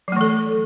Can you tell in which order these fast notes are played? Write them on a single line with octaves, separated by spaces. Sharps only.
F#3 A3 E3 A4